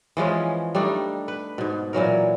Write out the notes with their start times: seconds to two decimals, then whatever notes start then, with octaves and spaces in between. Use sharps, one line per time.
0.17 E3 F3 G#3 C#4
0.75 G3 A3 D4 D#4
1.28 B4
1.58 G#2 B2
1.93 A#2 E3 F#3 A#4